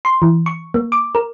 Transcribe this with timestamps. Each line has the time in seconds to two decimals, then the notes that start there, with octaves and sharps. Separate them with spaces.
0.05 C6
0.22 E3
0.46 C#6
0.74 A#3
0.92 D6
1.15 A#4